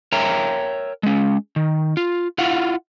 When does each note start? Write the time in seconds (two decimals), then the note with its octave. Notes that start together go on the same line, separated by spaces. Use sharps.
0.12 A#4 C#5 E5 G5 A#5
1.03 G#3 C#4
1.56 D#3
1.97 F4
2.38 E4 F4 F5 F#5